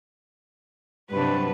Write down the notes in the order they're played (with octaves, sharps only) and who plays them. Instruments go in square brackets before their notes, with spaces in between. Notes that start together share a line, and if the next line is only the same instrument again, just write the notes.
[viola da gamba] G2 C3 F#3 [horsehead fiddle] D4 B4